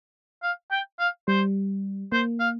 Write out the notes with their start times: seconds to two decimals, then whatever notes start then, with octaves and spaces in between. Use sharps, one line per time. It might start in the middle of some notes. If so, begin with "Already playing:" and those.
0.43 F5
0.71 G5
0.99 F5
1.28 G3 C5
2.12 A#3 C5
2.40 F5